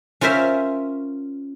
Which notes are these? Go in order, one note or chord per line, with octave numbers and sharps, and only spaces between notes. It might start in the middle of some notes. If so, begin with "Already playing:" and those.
C#4 F4 A#4 C5 E5